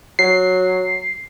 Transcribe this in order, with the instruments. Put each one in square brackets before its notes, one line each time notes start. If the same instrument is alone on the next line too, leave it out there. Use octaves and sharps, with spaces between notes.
[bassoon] F#3 [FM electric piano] C7